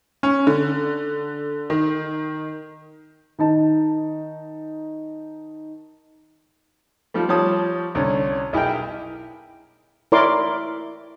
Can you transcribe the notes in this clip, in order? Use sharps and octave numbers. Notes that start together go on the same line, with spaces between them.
C#4
D3
D#3
D#3 D#4 A5
F3 G3 A3
F3 G3 C#5 A5 D#6
C2 D3 C#4 C#5
B1 E4 G#4 A#4 G5
E4 A#4 C#5 D5 C6 D6